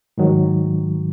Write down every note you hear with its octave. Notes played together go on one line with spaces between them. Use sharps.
G#2 D#3 F#3